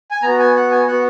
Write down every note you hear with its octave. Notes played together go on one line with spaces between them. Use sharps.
G#5
B3 F#4 A#5
G#5
F#5
G#5
B3 F#4 F#5